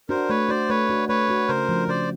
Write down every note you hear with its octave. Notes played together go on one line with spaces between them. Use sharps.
D4 F#4 A#4 C5
A3 B4 C#5
D4 F#4 C5 D5
A3 B4 C#5
D4 F#4
A3 B4 C#5
D4 F#4
C#3 A#4 C5
F3 A3 D4
C#3 C5 D5